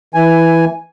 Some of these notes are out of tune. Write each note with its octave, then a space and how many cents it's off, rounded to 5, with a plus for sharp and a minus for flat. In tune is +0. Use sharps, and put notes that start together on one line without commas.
E3 +0 G#5 +0